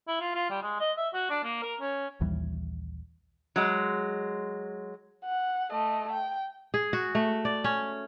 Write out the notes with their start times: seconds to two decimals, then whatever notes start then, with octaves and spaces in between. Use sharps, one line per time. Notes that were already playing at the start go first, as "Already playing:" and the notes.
0.07 E4
0.20 F4
0.35 F4
0.50 G3
0.62 G#3
0.80 D#5
0.97 E5
1.13 F#4
1.30 D4
1.43 A#3
1.62 A#4
1.81 C#4
2.21 A#1 D#2 E3 G3
3.56 F#3 G#3
5.25 F#5
5.71 A3 D#5
6.13 G5
6.74 G#4
6.93 F#4
7.15 A3
7.45 D5
7.64 C#4